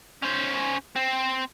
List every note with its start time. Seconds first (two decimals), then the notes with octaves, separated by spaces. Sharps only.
0.22 C#4 C5
0.96 C4